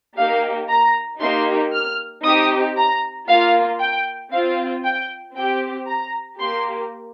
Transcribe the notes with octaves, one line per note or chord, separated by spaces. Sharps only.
A#3 D#4 G4 F5
A#5
A#3 D#4 G4 C6
F6
C4 D#4 G4 D#6
A#5
A#3 F4 F5
G5
C4 F4 F5
G5
C4 G4 G5
A#5
A#3 G4 C6